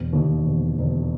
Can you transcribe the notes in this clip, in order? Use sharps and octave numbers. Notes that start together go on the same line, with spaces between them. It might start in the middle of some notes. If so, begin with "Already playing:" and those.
Already playing: E1
D#2
E1
E1